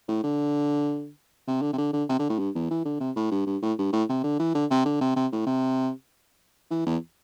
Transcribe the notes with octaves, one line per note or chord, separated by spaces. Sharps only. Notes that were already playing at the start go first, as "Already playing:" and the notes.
A2
D3
C3
D3
C3
D3
D3
C3
D3
A2
G2
E2
E3
D3
C3
A2
G2
G2
A2
G2
A2
C3
D3
E3
D3
C3
D3
C3
C3
A2
C3
E3
E2